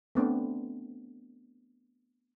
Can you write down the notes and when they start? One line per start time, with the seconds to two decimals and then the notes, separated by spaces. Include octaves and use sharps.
0.15 A3 B3 C4 D4